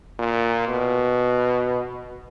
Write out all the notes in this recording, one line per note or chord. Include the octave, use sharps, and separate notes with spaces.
A#2
B2